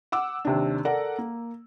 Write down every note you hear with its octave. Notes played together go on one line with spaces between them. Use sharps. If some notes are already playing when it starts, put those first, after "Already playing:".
F#5 D6 E6
D#2 C3 D4
A4 A#4 D5 F#5
A#3